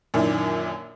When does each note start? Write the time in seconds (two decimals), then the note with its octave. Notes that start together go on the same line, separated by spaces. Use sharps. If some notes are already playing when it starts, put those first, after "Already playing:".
0.14 F#2 A#2 D#3 E3 D4